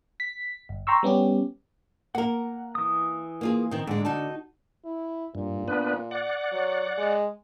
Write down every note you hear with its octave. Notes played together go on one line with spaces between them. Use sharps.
B6
G1
G5 A#5 C6 C#6 E6
G3 B3 C#4 G4
A#3 A#4 F#5
E3 D#6
A#3 F4 G#4
D#3 C4
G#2 D3 G#3
D#4 F#4 A5
E4
G2 A#2
B3 D4 B4
D5 F#5
F#3
G#3